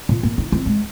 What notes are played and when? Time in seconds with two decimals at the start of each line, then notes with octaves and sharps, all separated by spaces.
0.09 A#2
0.23 A#3
0.38 D#4
0.52 C4
0.66 G#3